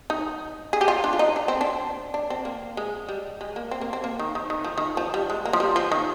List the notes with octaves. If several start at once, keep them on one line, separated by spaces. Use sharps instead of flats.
D#4
G#4
G4
F4
D4
F4
D#4
D4
C4
D4
D4
C4
A#3
G#3
G3
G#3
A#3
C4
A#3
C4
A#3
D#3
D#3
D#3
F3
D#3
F3
G3
G#3
A#3
F3
G3
F3
D#3